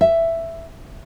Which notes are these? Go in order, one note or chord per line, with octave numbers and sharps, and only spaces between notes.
E5